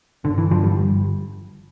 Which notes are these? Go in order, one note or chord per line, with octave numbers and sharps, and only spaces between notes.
G1 D3
E3
G2 D3 F3
G3
G1